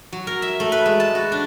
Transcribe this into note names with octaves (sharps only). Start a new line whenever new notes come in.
F#3
A#4
E5
A3
B4
G#3
A5
F#4
D4